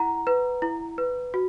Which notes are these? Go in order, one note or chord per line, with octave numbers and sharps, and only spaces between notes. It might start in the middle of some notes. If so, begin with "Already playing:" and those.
Already playing: E4 F#5 A#5
B4
E4
B4
F#4